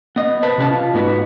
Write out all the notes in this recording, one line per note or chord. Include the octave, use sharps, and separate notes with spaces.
B3 D#5
B4 C5 A5
C3 C#4 B4 A5
F4
G#2 B3 D#4 F#4 G#4 B4